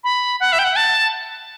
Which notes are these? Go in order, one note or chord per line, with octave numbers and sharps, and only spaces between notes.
B5
F#5
E5
G5
F#5
A5